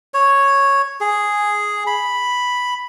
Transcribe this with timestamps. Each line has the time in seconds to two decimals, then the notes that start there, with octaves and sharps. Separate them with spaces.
0.14 C#5
1.00 G#4
1.87 B5